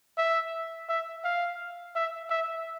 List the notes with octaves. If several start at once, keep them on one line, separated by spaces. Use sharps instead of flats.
E5
E5
F5
E5
E5